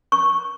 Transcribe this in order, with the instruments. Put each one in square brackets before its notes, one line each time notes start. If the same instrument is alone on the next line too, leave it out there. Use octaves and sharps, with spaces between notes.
[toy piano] C#6